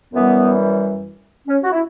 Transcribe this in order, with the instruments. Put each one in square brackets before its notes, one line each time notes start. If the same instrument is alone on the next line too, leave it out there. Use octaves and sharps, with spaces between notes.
[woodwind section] F#2 E3 G3 B3
C#4
F#4
E4